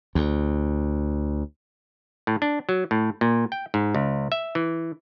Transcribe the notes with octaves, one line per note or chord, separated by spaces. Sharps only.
D2
A2
D4
F#3
A2
A#2
G5
G#2
C#2
E5
E3